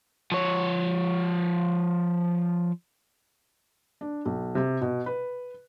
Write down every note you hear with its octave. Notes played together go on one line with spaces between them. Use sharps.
F3 C#5
D4
B1
C3
B2
B4